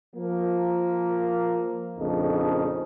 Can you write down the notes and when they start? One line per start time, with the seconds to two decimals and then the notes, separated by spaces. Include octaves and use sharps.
0.16 F3 A#3
1.99 A#1 F2 C#3 A3 D#4